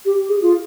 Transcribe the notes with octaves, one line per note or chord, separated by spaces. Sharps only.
G4
G#4
F4